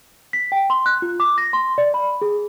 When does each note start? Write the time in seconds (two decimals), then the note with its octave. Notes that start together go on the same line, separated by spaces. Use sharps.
0.33 B6
0.52 G5
0.70 C6
0.86 F#6
1.02 F4
1.20 D6
1.38 A#6
1.53 C6
1.78 D5
1.94 B5
2.22 G#4